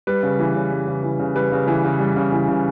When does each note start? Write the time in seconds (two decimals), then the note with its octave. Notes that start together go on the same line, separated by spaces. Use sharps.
0.07 G3 B4
0.23 C#3
0.39 E3
0.55 C#3
0.72 G3
0.88 C#3
1.03 E3
1.20 C#3
1.35 G3 B4
1.52 C#3
1.68 E3
1.84 C#3
1.99 G3
2.16 C#3
2.32 E3
2.48 C#3